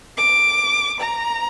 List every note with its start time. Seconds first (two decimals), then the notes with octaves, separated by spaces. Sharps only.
0.17 D6
1.00 A#5